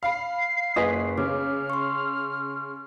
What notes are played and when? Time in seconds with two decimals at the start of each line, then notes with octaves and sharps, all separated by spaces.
0.03 F5 B5 C7
0.76 F#1 G#4 B4 D#5 B6
1.18 C#3 D6 F6
1.70 C6 C#6